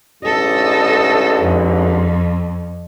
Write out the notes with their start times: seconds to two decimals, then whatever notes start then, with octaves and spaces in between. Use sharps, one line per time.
0.23 A1 G#2 D3 A4 D#5
1.41 F2